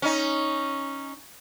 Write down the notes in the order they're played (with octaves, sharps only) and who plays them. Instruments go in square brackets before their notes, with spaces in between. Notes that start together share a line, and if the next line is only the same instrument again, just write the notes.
[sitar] C#4 D#4